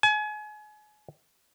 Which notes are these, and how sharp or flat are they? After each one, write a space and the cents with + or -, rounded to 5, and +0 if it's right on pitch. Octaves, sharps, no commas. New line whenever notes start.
G#5 +35